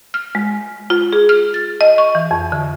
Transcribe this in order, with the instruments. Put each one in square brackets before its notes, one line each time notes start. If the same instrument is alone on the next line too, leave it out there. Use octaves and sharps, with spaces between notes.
[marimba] F6
G#3
F4
G#4
F6
A6
D#5
C#6
E3
F2
D3